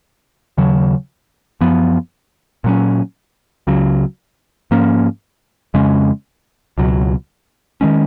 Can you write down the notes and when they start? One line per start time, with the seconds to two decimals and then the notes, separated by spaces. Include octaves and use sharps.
0.58 D#2 C#3 F#3
1.61 F#2 F3 B3
2.64 A#2 F#3 C#4
3.67 C#2 C#3 F#3
4.71 G#2 F3 A#3 C#4
5.74 F2 C#3 G#3 C#4
6.78 C#2 B2 F#3
7.81 D#3 G#3 C#4